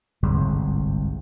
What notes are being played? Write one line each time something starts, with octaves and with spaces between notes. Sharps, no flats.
G1 C2 G#2